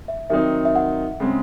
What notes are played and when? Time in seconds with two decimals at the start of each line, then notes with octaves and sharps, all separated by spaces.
0.08 E5
0.30 D#3 F#3 C4 D#4 E5
0.65 E5
0.75 F#5
1.20 C#3 G#3 C4